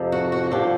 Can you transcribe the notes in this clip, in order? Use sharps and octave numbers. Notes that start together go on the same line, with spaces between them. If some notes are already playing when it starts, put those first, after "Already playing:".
Already playing: F2 C3 F3
F#4
F#4
G2 D3 F3 G4